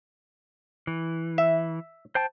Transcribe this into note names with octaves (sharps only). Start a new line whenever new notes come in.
E3
E5
C5 G5 A5